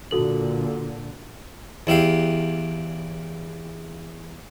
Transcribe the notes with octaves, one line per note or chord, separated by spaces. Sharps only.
A#2 D3 F#4 A4 F#7
E2 E4 G4 F5